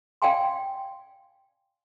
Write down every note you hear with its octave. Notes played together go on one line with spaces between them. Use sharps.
D5 F5 G5 G#5 C6